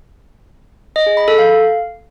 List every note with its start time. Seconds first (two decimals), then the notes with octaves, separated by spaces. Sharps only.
0.96 D#5
1.06 G#4
1.17 B5
1.28 A4
1.38 F5